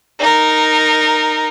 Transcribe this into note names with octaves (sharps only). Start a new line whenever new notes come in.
D#4 A#4